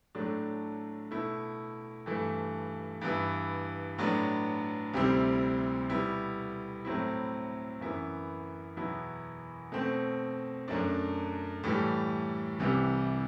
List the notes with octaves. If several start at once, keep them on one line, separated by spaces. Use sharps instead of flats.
A2 F#3 A3 D4
B2 A3 E4
G2 E3 A3
G2 E3 B3 E4
A2 F#3 B3 D4
D2 C3 G3 C4 E4
B2 G3 B3 E4
A2 F#3 C4 E4
F#2 E3 B3 E4
E2 B2 F#3 B3 E4
B2 A3 C4
F#2 F#3 A3 D4
A2 E3 G3
C2 C3 E3 G3